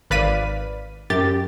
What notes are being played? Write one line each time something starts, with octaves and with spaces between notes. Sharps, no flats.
G#1 B4 D5 F5 B6 D#7
F#2 G4 A6